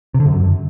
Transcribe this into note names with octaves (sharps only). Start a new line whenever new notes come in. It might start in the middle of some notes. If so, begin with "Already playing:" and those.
C3
D3
F#2